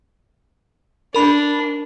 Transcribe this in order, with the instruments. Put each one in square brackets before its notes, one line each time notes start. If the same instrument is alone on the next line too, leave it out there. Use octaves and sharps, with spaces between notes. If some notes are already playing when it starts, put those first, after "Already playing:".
[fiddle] D4 [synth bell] A#4 B5